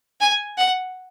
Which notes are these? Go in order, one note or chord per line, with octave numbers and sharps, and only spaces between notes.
G#5
F#5